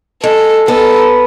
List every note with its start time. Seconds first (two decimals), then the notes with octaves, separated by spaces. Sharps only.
0.23 G#3 A4
0.68 B3 A4